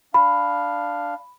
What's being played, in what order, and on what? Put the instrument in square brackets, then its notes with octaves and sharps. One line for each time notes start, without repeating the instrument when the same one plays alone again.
[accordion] D4 F5 [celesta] B5